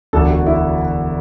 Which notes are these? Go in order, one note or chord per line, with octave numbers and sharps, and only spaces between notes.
E1 D2 D3 A4
F#4
E4